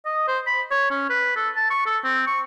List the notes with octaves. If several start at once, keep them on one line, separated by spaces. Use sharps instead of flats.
D#5
C5
B5
C#5
C#4
B4
A4
A5
C#6
A4
C4
C#6